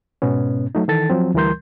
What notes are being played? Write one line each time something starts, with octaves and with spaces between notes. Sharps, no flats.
G#2 B2 B3 C#4
F#3 A3 D#4
D#3 E3 A4 A6
F3 F#3 C4
D2 E3 G3 A#4 C6 G6